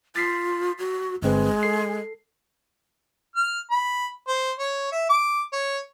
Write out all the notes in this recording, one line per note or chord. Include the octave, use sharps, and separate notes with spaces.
F4 A6 B6 C7
F#4
G1 G#3 C4 B4
A4 C7
F6
B5
C5
C#5
E5
D6
C#5